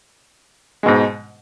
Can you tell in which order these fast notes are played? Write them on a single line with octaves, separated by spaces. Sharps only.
G#3 B2 G#2